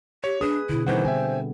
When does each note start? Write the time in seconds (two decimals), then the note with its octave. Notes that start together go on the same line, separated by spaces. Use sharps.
0.24 G4 C#5
0.41 D4 G#4 B4 D#6
0.69 B2 D3 E4
0.87 B2 D#3 E3 G3 C4 C5 F#5
1.05 D3 B3 E5 G5 G#5